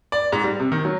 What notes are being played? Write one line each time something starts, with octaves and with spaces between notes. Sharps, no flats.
D5
G#2
G3
C3
D#3
F#3